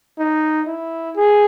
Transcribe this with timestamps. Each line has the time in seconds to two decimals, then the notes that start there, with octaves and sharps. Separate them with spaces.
0.18 D#4
0.67 E4
1.16 G#4